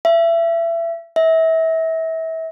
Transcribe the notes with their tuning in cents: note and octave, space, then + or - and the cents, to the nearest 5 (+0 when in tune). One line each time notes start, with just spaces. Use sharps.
E5 +30
E5 -30